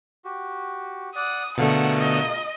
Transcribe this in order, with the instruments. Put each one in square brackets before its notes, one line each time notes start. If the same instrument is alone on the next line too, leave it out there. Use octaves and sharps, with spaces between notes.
[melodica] F#4 G4
[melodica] D5 F#5 [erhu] D#6
[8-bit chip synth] B2 D3 A3 [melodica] F4 G#4 A#4 [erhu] F#5
[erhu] D#5